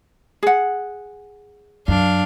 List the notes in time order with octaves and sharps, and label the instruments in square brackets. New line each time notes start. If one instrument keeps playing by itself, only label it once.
[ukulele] G#4 F#5
[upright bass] F#2 [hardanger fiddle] D4 F5